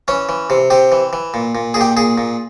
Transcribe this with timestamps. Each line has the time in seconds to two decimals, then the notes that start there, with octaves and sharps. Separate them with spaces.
0.08 E3 C#4
0.29 E3
0.50 C3
0.70 C3 G4
0.92 E3
1.13 E3
1.34 A#2
1.55 A#2
1.74 A#2 G#4
1.81 G4
1.97 A#2 G#4
2.18 A#2